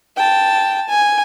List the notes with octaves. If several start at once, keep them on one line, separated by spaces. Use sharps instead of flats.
G5 A5
G#5